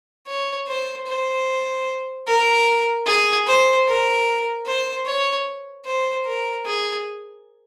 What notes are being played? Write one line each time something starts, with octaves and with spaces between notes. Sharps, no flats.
C#5
C5
C5
A#4
G#4
C5
A#4
C5
C#5
C5
A#4
G#4